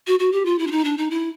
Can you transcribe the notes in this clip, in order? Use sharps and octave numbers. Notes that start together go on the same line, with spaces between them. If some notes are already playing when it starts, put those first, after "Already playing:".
F#4
F#4
G4
F4
E4
D4
D#4
D4
D#4
E4